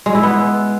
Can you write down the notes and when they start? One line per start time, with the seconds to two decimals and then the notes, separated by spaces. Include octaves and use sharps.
0.06 G#3
0.15 E4
0.23 B3